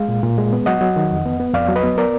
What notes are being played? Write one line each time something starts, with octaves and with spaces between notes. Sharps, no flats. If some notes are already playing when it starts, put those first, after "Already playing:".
Already playing: G#3 F5
A#2
A#2
G#3
B3
F#3 D#5 F#5
F#3
D#3
F2
B3
B3
F2 D5 F5
F#3
B4 D#5
B3
B3 A#4 D5